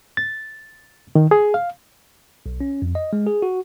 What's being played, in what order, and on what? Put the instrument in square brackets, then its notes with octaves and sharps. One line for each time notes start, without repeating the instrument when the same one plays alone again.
[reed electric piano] A6
D#3
G#4
F5
[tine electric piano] B1
C#4
F2
D#5
G#3
G#4
F#4